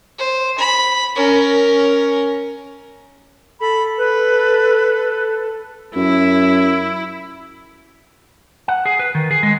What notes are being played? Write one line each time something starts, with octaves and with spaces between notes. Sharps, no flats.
C5
B5
C#4 A#4
A4 B5
B4
F#2 E4
F#5
G#4
B4
D#3
G#4
G#3